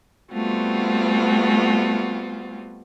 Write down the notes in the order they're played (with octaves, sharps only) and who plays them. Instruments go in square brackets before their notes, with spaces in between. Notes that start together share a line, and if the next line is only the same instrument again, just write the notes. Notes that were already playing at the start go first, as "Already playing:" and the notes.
[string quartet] G3 A3 B3 C4 F4 F#4